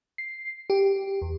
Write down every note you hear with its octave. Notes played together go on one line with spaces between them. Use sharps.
C7
G4
E2